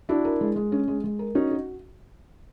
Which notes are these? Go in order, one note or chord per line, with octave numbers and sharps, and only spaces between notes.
D4 E4 F#4
A#4
G#3
G#3
C#4
G#3
G#3
A#4
C#4 D#4 F#4
F#4